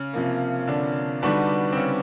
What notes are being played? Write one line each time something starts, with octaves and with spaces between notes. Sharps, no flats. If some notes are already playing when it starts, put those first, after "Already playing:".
Already playing: C#3 C#4
C3 F3 A#3
D3 D4
D3 G3 B3 D4 D#4 F#4 B4
C4
C#3 C#4